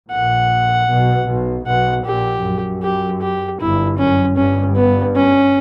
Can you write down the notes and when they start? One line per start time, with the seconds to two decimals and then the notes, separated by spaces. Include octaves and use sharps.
0.11 A#1 A#2 F#5
0.88 B1 B2
1.27 B1 B2
1.66 B1 B2 F#5
2.05 A#1 A#2 G4
2.43 F#2
2.83 G4
3.21 G4
3.59 G1 G2 E4
3.98 F#2 C#4
4.36 G1 G2 C#4
4.75 B3
5.15 C#4